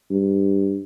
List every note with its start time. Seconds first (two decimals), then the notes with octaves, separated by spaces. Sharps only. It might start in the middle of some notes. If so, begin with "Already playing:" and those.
0.10 G2